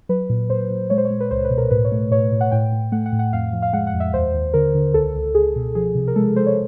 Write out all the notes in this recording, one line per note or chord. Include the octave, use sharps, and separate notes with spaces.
F#3 B4
A#2
A#2 C5
A#2
G#3 C#5
C5
C#5
G#3
B4
C#2 C5
B4
B2
A#4
A2 B4
C#5
A3
A2 C#5
A2
F#5
A2 G5
A2
A3 F#5
F#5
A2
F#5
F2 F5
F3
F5
G#3 F#5
F#5
F2
E5
D#2 C5
D#2
D3 A#4
D3
C#2 A4
C#2
C#2 G#4
B2
F3 G#4
C3
A#4
G#3 A4
G#3 C5
C#5